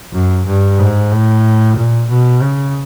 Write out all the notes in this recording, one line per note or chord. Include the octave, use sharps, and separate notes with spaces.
F#2
G2
G#2
A2
A#2
B2
C#3